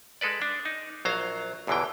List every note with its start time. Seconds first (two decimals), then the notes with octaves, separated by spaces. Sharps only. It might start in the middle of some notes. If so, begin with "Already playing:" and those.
0.21 G#3 A4 B4 D5
0.42 D4
0.65 D#4
1.05 A#1 F#3 C5 F5 A#5
1.67 G1 E2 B2 D3 E3 G5